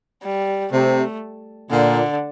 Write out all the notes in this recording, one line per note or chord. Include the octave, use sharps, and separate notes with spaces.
G3
C3 A3
A#2 D3